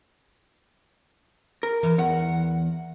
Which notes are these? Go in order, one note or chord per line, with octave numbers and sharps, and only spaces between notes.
A#4
E3
E2 F#5